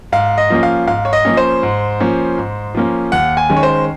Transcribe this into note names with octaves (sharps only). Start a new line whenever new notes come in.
G#2 F5
D#5
F3 A#3 C#4
F5
G#2 F5
C#5
D#5
F3 A#3 C#4
C5
G#2
F3 A#3 C#4
G#2
F3 A#3 C#4
D#2 F#5
G#5
D#3 G#3 C#4
C#5
C5